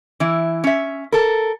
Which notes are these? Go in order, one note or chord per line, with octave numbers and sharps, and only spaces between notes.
E3 E4
C#4 E5
A4 A#4